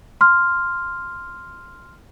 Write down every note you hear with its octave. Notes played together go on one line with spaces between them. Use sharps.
C6 F6